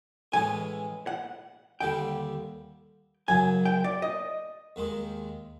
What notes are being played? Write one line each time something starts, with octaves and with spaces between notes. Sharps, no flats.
A2 E3 G#3 C#4 G#5
F#5
D#2 D3 G3 G5
F#2 C#3 F#3 G#5
G5
D5
D#5
D#2 D#3 G#3